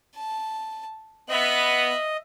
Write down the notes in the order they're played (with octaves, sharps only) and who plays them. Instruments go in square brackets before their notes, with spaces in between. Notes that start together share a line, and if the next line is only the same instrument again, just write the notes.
[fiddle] A5
[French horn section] B3 [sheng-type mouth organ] D#5 [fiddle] E5 F#6